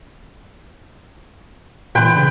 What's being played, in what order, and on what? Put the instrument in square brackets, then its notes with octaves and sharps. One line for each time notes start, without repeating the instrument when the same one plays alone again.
[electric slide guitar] A#2 E3 [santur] B4 G5 C6
[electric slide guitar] C#3 D4 G#4